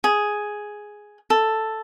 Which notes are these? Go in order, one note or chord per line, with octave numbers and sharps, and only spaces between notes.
G#4
A4